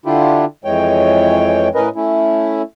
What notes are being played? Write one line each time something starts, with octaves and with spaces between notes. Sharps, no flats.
D3 D4 E4 F4 G4
F2 E3 G#3 C#5 G5
A2 C#4 A#4 B4 D#5
A3 C#4 E4